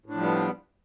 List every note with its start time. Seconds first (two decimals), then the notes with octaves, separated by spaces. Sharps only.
0.06 A2
0.10 D4
0.14 F3
0.18 G3
0.22 B3